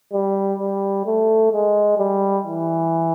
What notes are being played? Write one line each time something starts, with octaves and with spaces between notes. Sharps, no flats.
G3
G3
A3
G#3
G3
E3